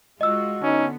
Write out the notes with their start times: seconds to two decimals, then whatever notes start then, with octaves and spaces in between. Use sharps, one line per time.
0.21 G#3 F4 F#4 D#5 E6
0.63 D3 B3 C#4 D#4